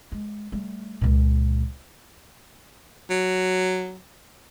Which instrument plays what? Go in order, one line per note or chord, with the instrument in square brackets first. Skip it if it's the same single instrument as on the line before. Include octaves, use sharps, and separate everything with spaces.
[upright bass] G#3
G3 A3
C#2 A#2
[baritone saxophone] F#3